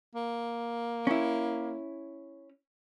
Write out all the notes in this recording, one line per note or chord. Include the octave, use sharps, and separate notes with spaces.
A#3
C#4 E4